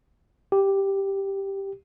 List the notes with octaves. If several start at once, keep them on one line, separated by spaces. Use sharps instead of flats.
G4